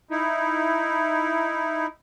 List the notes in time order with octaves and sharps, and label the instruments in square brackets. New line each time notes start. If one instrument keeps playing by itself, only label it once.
[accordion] D#4 E4